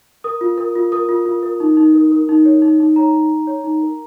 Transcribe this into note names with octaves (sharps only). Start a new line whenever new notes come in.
A#4 D#6
F4
A#4
F4
A#4 D#6
F4
F4
A#4
D#4
D#4
A#4
A#4
D#4
C#5
D#4
D#4
C#5 A#5
D#4
D#4
C#5
D#4
A#4